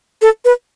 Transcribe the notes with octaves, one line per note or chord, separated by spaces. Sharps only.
A4
B4